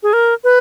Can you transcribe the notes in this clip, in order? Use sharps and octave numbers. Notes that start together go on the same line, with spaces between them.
G#4
A#4
B4